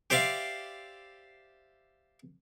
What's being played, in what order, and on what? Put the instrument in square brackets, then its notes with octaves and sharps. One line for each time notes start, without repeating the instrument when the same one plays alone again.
[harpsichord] G4 C5 D5 E5 F5